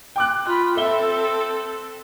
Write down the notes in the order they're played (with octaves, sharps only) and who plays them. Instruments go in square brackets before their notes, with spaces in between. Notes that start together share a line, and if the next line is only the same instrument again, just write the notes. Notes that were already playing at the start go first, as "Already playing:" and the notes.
[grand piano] G5 D6 F#6
[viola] F4 B5
[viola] C4 A4 [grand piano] E5 G7